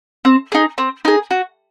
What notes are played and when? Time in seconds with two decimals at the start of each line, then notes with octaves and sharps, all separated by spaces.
0.25 C4
0.52 D#4 G#4
0.78 C4
1.05 D#4 G#4
1.31 F#4